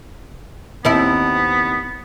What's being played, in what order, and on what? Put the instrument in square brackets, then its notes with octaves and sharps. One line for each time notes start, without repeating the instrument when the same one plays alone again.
[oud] D#2 C4 E4 [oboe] B3